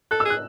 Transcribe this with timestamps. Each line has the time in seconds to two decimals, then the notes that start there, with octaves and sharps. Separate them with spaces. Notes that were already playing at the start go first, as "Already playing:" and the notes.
0.11 A4 F#6
0.20 E6
0.25 G#4
0.30 F#6